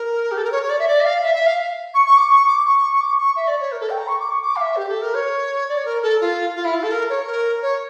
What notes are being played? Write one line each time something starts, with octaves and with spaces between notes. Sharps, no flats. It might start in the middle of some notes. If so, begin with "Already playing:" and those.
Already playing: A#4
G4
A4
A#4
C#5
C#5
D5
E5
D5
E5
F5
E5
E5
F5
C#6
C#6
D6
C#6
D6
C#6
C#6
D6
C#6
E5
D5
C#5
A#4
A4
G5
A#5
C#6
D6
C#6
D6
F5
E5
G4
A4
A#4
C#5
D5
C#5
A#4
A4
F4
F4
E4
F4
A4
A#4
C#5
A#4
C#5